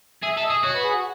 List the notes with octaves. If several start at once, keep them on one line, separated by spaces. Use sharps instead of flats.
G#4 E5
A4 E5
D#5
G#4
F#4 C#5
B4
G#4
F#4